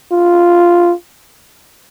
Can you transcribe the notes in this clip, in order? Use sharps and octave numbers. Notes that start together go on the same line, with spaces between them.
F4